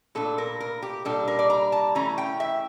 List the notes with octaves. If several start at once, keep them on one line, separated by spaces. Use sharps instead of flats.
A#2 A3 D4 A4
A#4
A#4
G4
A#2 G3 D4 A4
A#4
D5
A#5
A5
E3 A3 C#4 A#5
G5
E5